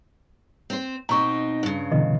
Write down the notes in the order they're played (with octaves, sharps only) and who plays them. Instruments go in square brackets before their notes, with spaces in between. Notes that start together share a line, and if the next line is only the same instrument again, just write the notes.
[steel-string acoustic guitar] C4 C5
[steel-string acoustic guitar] B2 C4 D#4 [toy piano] A#5 C#6
[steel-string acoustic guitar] G2 C#3
[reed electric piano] B2 D3 E3 [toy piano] D#5